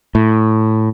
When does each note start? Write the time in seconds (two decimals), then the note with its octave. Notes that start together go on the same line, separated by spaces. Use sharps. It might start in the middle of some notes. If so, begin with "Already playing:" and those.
0.15 A2